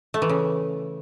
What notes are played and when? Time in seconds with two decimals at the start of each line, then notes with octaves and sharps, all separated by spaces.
0.14 A3
0.22 E3
0.29 C#3